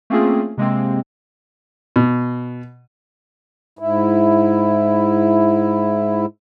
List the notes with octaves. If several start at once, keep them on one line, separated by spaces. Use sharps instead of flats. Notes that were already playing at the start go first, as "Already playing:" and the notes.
A3 A#3 C4 C#4 F4 G#4
C3 G#3 A#3 C4
B2
G#2 E4